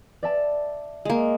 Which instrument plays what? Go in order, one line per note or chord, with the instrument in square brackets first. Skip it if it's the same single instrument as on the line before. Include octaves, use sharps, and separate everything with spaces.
[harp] D5 E5 A5
[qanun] G#3 A#3